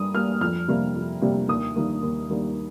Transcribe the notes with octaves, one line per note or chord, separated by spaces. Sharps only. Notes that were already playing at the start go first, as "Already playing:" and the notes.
Already playing: G2 G3 A#3 D#6
G3 A#3 F6
F2 F6
C3 G3 A#3
F2
C3 G3 A#3
D#2 D#6
D#3 G3 A#3
D#2
D#3 G3 A#3